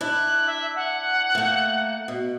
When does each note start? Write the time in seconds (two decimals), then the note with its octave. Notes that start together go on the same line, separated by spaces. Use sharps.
0.01 D4 E4 F#6
0.47 E5
0.76 F#5
1.35 A3 A#3
2.08 B2